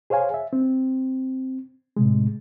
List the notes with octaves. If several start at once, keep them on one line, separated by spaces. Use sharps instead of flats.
G#4 C5 C#5 F5 G#5
E5
C4
A2 C3 G#3